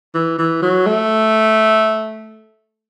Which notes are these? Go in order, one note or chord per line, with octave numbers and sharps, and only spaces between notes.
E3
E3
F#3
A3